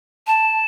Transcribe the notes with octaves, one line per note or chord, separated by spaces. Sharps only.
A5